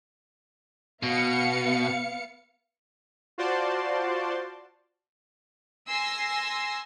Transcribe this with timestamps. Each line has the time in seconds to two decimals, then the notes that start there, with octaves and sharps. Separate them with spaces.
1.03 B2 B3 F5 C#7
3.38 F4 F#4 C5 D5 A5 C6
5.88 G#5 C6 E6 A#6 C7